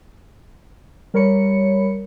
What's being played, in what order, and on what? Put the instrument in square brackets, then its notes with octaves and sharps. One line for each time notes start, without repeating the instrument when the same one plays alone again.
[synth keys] G3 A#4 C#5 B5 C#7